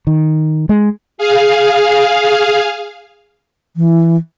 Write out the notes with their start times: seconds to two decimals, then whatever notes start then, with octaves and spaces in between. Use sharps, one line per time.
0.07 D#3
0.69 G#3
1.18 G#4 F5
3.77 E3